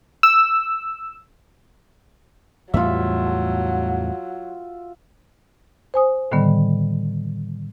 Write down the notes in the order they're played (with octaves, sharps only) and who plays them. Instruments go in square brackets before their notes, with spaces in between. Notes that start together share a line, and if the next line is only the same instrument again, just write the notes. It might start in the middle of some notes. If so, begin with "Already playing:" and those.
[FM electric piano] E6
[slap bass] E2 A2 G3 [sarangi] F#3 [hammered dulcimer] F4 E5
[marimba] C5 G#5 D#6
A2 D3 D#3 G3 B3